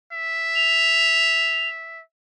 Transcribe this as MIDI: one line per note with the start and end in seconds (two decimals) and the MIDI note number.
0.12 2.02 76
0.56 1.69 101